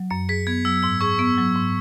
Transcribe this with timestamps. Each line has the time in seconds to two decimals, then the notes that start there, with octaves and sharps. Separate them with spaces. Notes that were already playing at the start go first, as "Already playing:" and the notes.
Already playing: F#3
0.10 F#2 C#7
0.29 G#4 B6
0.47 B3 G#6
0.65 F#3 E6
0.83 G#2 E6
1.01 G#4 C#6
1.19 B3
1.37 F#3
1.55 G#2